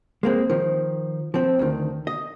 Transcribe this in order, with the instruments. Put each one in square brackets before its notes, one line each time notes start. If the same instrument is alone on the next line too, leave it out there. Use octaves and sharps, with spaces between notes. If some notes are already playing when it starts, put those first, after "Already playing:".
[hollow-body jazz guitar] G#3 A#3 C4
D#3 F3
F3 C4
D2 D#3
D#5